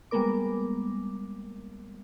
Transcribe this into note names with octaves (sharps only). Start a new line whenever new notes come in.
G3 G#3 A#3 B3 A#4 D6